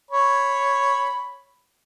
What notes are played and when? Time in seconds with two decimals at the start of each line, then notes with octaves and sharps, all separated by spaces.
0.11 C#5 B5